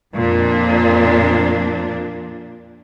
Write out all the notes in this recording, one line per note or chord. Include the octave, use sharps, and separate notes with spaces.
F2 A#2 D4